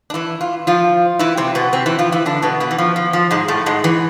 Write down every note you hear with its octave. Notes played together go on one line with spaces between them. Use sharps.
D4
E3 E4
F4
F3 F4
E3 E4
C3 C4
B2 B3
C3 C4
E3 E4
F3 F4
E3 E4
D3 D4
B2 B3
B2 B3
E3
F3
F3
F3
G#2 G#3
A2 A3
G#2 G#3
E3